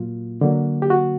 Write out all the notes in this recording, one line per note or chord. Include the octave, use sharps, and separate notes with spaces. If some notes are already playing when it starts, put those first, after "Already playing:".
Already playing: A#2 F#3 A#3 F4
D3 F#3 A#3
G4
F#4